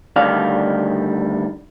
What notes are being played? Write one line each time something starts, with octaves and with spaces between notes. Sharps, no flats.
D2 D#3 G3 A4 D5 F5